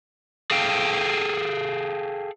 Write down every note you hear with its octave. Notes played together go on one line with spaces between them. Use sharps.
G#4 A4 F5 G5